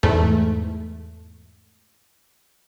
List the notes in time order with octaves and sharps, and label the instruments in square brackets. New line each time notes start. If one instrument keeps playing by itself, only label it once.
[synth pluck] E2 G#2 A3